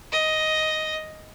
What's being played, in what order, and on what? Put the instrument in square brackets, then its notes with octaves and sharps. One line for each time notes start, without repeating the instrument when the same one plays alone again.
[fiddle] D#5